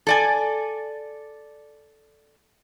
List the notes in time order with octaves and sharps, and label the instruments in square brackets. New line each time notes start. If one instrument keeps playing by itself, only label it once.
[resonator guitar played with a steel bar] A4 D5 G#5